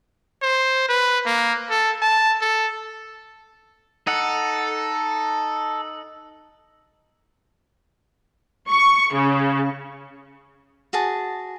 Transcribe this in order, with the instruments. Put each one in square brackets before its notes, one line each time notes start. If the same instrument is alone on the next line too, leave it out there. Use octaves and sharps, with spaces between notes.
[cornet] C5
B4
A#3
A4
A5
A4
[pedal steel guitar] D#4 F#5 [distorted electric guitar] A4
[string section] C#6
C#3
[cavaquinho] F#4 G#4 A5